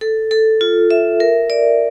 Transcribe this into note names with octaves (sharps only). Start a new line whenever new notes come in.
A4
A4
F4
E5
A#4
D5